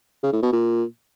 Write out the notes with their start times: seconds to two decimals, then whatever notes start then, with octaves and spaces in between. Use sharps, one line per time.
0.23 C#3
0.33 A2
0.43 B2
0.52 A#2